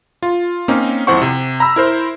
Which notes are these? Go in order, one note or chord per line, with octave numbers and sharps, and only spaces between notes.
F4
A#3 C4 C#4 D#4
G#1 F2 E4 C5 F#5 C#6
C3
A#5 B5 E6
E4 A#4 C5